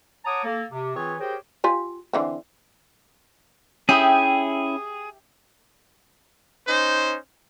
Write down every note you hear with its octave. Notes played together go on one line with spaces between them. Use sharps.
C#5 F#5 A5 A#5 D6 D#6
A#3 A4
C3
E3 C4 F4 G#4 B4 C#5
G4 G#4 A#4 C5 C#5 G5
F4 G4 G#5
D3 E3 C4
C#4 E4 G4 G#4 E5 G5 D#6
C#4 D#4 C5